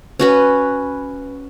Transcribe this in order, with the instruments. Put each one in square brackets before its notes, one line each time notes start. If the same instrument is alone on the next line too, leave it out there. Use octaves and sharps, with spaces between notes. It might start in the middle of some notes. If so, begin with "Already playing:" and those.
[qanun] C#4 F#4 B4